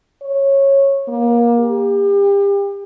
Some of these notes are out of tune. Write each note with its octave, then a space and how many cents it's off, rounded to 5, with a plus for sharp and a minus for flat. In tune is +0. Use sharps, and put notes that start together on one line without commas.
C#5 -15
A#3 +25
G4 +35